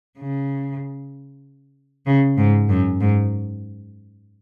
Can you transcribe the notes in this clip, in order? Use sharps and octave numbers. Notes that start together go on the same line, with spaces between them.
C#3
C#3
G#2
F#2
G#2